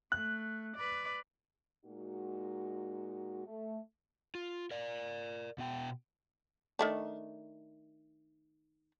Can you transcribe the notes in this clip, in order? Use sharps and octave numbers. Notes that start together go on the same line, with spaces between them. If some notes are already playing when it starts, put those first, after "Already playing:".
A3 F#6
B4 D5
A#2 G#3 D#4 F#4
A3
F4
A#4 D5
B2 B3 G5
D#3 A3 D4